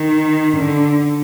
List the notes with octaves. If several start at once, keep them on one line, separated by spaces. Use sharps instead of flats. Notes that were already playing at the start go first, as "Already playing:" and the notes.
Already playing: D#3
D3